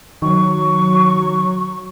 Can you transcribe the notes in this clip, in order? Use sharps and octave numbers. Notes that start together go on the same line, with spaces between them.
D#3 F#3 C#6